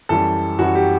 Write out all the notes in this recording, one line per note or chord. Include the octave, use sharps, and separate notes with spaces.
F#2 E3 G3 A4
F#2 E3 G3 F#4
G4